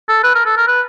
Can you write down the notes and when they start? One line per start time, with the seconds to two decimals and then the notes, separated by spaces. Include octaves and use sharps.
0.09 A4
0.24 B4
0.35 A#4
0.46 A4
0.57 A#4
0.67 B4